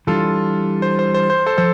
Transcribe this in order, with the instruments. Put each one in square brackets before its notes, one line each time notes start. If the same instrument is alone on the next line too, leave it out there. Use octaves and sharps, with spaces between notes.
[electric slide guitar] E3 G3 D4 [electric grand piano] F4 A4
[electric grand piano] C5
C5
C5
C5
A4 C5
[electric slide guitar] F3 [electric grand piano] A4 C5